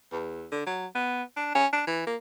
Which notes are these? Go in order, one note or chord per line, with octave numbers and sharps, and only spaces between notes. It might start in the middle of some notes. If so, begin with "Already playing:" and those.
E2
D3
F#3
B3
D4
C#4
D4
E3
A#3